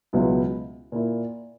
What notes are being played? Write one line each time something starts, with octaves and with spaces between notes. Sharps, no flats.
C#2 B2 F#3 B3 E4
A#2 A#3 E4